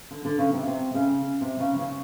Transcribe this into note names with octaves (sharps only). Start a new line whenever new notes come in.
D3
D3
C#3
C3
C3
C#3
C3
C#3
C#3